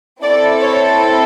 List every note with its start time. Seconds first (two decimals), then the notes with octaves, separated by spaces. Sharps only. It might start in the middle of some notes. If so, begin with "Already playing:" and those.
0.23 C4 E4 A4 D5
0.62 C#5